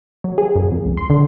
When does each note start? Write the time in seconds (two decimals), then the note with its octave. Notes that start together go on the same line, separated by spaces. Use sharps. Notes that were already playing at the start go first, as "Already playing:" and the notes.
0.24 F#3
0.38 G#4
0.56 F#2
0.72 F2
0.86 C#2
0.97 C6
1.10 D3